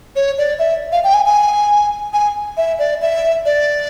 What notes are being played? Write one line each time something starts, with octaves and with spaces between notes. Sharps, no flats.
C#5
D5
E5
F5
G5
G#5
G#5
G#5
E5
D5
E5
D5